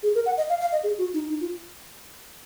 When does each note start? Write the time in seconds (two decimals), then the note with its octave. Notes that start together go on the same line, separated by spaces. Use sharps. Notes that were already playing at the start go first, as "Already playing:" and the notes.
0.03 G#4
0.15 A#4
0.26 F#5
0.37 D#5
0.49 F5
0.61 F5
0.72 D#5
0.83 G#4
0.98 F#4
1.14 D#4
1.30 D#4
1.41 F4